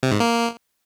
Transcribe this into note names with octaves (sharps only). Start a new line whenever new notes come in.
C3
G#2
A#3